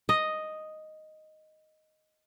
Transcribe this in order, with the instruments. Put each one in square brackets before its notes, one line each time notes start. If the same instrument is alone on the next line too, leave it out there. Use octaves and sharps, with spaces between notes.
[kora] D#5